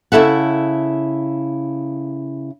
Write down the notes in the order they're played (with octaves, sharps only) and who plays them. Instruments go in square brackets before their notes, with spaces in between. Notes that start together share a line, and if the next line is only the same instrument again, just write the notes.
[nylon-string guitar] C#3 E4 A4 E5 F#5